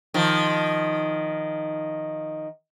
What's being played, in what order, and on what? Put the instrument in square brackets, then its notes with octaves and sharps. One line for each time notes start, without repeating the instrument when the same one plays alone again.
[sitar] D#3 F3